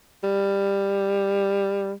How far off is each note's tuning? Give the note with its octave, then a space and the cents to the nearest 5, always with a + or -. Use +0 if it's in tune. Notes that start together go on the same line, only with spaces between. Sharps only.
G3 +15